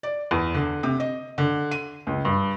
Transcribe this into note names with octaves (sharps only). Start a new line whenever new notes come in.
D5
E2
D3
C3
D#5
D3
D#7
C#2
G2